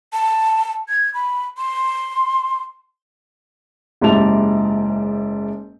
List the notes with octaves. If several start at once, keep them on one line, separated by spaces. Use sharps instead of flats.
A5
G#6
B5
C6
F#1 G#2 E4 G4 A5 F7